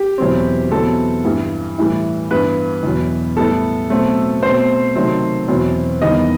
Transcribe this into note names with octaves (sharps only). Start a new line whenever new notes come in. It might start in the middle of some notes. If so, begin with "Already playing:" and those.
Already playing: G4
E2 B2 F#3 C4
E2 B2 F#3 C4 A4
G2 E3 G3
A2 E3 G3
G2 E3 G3 B3 B4
E2 B2 F#3
A2 G3 B3 A4
B2 F#3 A3 C4
B2 A3 C4 C5
C3 D#3 F#3 A3 C4
E2 B2 F#3 C4
E2 D#3 G3 B3 D#5